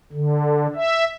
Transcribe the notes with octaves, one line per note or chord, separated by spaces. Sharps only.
D3
E5